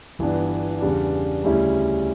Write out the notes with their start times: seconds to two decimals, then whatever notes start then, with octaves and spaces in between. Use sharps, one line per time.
0.19 G1 G2 E3 B3 D4
0.81 E2 C#3 G3 D4
1.44 D2 C#3 G3 C#4 E4